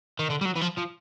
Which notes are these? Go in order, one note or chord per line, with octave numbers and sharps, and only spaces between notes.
D#3
D3
G3
F#3
E3
F3
F3